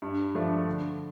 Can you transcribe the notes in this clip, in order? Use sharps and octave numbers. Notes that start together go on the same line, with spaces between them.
G2
F3 A3 D4
D3